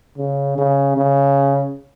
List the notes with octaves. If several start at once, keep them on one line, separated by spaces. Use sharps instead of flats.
C#3
C#3
C#3